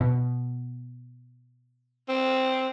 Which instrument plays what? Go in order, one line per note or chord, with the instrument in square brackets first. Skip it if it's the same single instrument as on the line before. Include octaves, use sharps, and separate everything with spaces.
[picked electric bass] B2
[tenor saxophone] C4